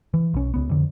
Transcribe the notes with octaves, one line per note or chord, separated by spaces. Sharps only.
E3
B1 C#4
C#2 B3
F2 D3